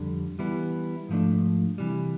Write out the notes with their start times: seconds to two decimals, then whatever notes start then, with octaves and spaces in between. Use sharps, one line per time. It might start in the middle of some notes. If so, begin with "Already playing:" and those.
Already playing: F2 D3 G3
0.39 E3 G3 B3 E4
1.09 G#2 F3 A3 D4
1.78 C3 E3 G3